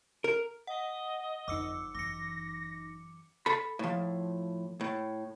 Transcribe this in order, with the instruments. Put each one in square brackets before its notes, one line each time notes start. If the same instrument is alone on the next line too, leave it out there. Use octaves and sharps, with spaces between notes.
[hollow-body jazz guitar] A#4
[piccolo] D#5 [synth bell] F#5
[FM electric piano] G1 D#4 [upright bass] F2 [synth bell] D6 E6 C#7
[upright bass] F#2 E3 [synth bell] D6 C#7 [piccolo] A#6
[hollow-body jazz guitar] A4 B5
A2 F3
A2